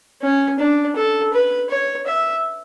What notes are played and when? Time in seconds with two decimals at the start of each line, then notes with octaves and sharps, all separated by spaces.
0.22 C#4
0.59 D4
0.96 A4
1.33 B4
1.70 C#5
2.06 E5